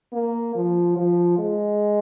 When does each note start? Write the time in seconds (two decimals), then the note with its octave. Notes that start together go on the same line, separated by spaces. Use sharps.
0.13 A#3
0.55 F3
0.96 F3
1.38 G#3